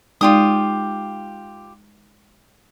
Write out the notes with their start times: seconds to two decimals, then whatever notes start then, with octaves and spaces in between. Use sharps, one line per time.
0.21 G#3 D#4 F4 G4 D5 D#6